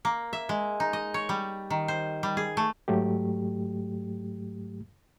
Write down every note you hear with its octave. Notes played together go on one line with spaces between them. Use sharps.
A#3
E5
G#3
D#4
D#5
C#5
G3
D#3
C5
G3
G#4
A3
G#2 F#3 A3 G4